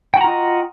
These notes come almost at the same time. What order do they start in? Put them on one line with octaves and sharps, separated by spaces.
G5 F#4 A#5 F4 D#5